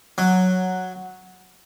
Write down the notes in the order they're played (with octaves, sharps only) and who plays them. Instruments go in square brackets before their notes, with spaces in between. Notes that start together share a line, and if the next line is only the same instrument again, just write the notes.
[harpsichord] F#3